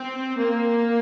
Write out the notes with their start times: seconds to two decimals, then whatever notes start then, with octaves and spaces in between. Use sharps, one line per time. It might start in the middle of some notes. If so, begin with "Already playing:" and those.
Already playing: C4
0.38 A#3